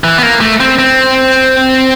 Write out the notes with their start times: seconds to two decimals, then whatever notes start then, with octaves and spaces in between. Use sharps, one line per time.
0.04 E3
0.18 B3
0.23 A#3
0.41 A3
0.60 C4
0.79 C4